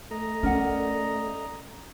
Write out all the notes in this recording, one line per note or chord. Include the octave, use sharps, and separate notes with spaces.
A3 D#5 A#5
C#4 A#4 D5 F#5